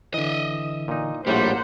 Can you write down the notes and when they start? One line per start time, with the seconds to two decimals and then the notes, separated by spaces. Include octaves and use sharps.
0.14 D3 E3 D#5 E5
0.88 A#2 D#4
1.27 A#1 A2 G3 A#3 G4 C5 F#5